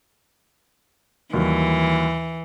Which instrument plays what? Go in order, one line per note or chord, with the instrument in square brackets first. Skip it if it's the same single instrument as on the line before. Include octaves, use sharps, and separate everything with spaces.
[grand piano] D#2 F#3 G3 [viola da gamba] E3